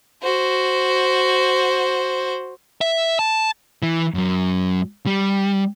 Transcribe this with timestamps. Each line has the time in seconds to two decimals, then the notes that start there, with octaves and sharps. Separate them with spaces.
0.22 F#4 C5
2.81 E5
3.19 A5
3.83 E3
4.14 F#2 F#3
5.06 G3